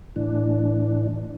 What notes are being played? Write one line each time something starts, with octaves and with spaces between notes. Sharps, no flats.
A2 E3 D4